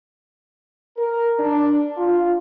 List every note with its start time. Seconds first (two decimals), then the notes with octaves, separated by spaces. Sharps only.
0.97 A#4
1.38 D4
1.97 F4